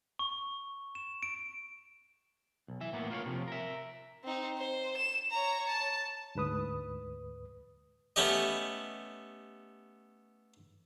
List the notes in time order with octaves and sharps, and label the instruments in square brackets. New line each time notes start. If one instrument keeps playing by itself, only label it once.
[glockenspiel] C#6
E7
D7
[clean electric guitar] B1
E3 E5
A2 A#3 B3
F4 A#4 C5 C#5
C3 E3 F3
A#4 E5
[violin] C4 D#4
C5
E7
C#5 A#5
A5
[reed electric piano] D2 G#2 B4 D#6
[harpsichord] A3 B3 C#4 G4 D#5